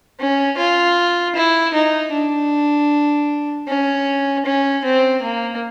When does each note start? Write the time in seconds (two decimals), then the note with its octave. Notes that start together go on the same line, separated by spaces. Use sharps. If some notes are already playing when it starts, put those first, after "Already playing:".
0.19 C#4
0.58 F4
1.35 E4
1.73 D#4
2.12 D4
3.67 C#4
4.45 C#4
4.84 C4
5.22 A#3